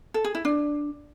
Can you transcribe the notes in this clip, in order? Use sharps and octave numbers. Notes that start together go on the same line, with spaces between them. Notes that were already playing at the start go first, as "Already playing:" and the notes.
A4
G#4
E4
D4